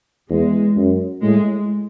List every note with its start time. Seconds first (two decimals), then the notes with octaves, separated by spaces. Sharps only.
0.29 E2 G#3
0.76 F#2
1.22 A2 G#3